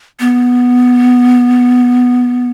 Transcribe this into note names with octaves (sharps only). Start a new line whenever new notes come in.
B3